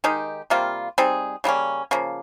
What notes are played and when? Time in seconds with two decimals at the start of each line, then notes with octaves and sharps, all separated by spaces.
0.04 D#3 G#3 D#4 G4
0.50 C3 G3 A#3 F4
0.98 G3 C4 D#4 G#4
1.44 C#3 G3 A#3 C#4
1.91 C#3 F3 A#3